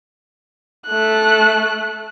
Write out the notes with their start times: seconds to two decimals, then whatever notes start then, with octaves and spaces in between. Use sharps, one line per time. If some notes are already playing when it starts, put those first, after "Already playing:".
0.88 A3 F#6